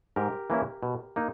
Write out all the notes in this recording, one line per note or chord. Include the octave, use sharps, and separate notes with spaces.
G#2 G4 A#4
E3 A#3 C#4 E4
B2
A#3 D#4